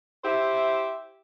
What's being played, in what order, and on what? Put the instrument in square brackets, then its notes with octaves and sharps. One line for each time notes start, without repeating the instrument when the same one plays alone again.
[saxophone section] E4 G4 C5 E5